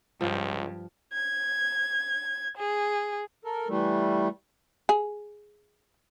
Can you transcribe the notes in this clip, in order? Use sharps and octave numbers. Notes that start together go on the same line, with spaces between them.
C#2 G2 F3
G#6
G#4
A4 A#4
E3 G3 A3
G#4